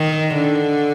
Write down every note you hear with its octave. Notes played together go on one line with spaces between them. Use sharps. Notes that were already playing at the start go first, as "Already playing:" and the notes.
Already playing: D#3
D3